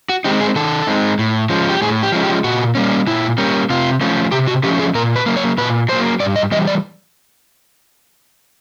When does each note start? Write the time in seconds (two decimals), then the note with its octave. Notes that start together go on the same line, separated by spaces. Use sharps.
0.09 F#4
0.24 G#3 C4 D#4 G4
0.41 G#4
0.56 D#3 A4
0.87 G#3 C4 D#4
1.19 A2
1.50 F3 G#3 C#4
1.70 G4
1.82 A2 G#4
2.03 G4
2.12 F3 G#3 C#4
2.23 G4
2.44 A#2 F#4
2.75 G3 A#3 C#4
3.07 A#2 E4
3.38 G3 A#3 C#4
3.70 C3 F4
4.01 F3 A3 C#4
4.32 C3 G4
4.47 F#4
4.63 F3 A3 C#4 G4
4.79 G#4
4.95 A#2 A#4
5.16 B4
5.26 F#3 A#3
5.36 C#5
5.58 A#2 B4
5.89 F#3 A#3 C5
6.20 G2 D5
6.36 D#5
6.52 E3 G3 D#5
6.67 D5